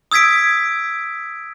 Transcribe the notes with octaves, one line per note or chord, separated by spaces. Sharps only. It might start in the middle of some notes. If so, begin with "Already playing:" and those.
D#6 E6 G#6 B6 D7